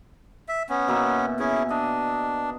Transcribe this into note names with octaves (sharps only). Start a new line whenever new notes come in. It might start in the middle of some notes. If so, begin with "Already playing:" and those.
E5
B3 C#4
B2 A#3 E5
C#4 E4 G#4
D4 D#5